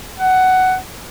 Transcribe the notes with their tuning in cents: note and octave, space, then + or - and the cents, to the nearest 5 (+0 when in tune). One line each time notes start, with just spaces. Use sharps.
F#5 +10